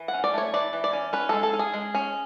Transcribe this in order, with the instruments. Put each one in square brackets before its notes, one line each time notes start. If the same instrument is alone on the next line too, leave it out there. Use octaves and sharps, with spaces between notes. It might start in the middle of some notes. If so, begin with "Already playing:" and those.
Already playing: [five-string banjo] E3
F#5
C#4
D5
A3 C#5
E3 D5
E3
D5
C#4
C#4 B4
G#3 A4
A4
C#4
G#4
G#3
C#4